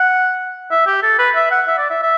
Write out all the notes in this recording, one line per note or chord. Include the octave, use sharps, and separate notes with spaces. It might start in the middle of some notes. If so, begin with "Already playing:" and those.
Already playing: F#5
E5
G4
A4
B4
E5
F#5
E5
D5
E5
E5